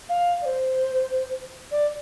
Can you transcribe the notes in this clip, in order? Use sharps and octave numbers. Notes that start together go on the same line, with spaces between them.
F5
D5
C5
D5